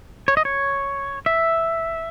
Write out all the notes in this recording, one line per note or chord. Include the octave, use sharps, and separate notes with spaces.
C#5
D#5
C#5
E5